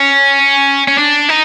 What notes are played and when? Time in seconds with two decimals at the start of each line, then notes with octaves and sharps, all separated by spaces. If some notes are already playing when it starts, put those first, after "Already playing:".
Already playing: C#4
0.88 C#4
0.98 D4
1.29 D#4